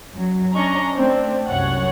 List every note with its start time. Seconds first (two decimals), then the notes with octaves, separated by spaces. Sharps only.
0.14 F#2 F#3
0.54 C#4 D4 D#5 A#5 C#6
0.94 A3 C4 D4
1.48 C2 F#2 C#5 F#5